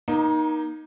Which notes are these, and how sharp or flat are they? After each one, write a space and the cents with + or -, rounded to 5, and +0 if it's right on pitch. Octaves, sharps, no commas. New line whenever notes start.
A#3 +30 D#4 +0